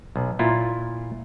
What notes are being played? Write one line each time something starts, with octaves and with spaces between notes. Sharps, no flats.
B1
A#2 E4 F4